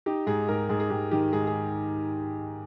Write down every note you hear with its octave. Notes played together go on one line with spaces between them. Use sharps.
D#4 G4
G#2 G#4
G#2 A#4
G#2 G#4
G#4
G#2 G4
D#3 G4
G#2 G#4
G#4